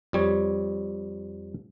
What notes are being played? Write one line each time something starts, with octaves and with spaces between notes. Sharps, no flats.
F2 G3 C#5